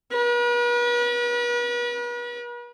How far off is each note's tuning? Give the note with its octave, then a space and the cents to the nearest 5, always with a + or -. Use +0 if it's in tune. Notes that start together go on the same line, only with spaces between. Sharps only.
B4 -40